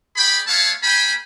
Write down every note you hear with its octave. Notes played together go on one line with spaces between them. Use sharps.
G#4 D5 G5 B5
A3 B3 E4 C#5 F5 A5
A#3 C5 G5 G#5 B5